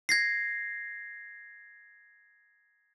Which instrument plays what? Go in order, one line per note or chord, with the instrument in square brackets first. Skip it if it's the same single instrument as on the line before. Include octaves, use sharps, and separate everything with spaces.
[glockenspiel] G#6 A#6 C7